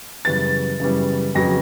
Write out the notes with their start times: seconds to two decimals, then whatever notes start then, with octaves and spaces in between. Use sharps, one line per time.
0.25 F#2 C#3 E3 G3 B3 A6
0.80 F#2 C#3 E3 G3 B3
1.35 F2 C#3 F#3 B3 A#6